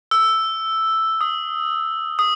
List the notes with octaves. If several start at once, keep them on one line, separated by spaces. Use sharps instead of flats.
E6
D#6
D#6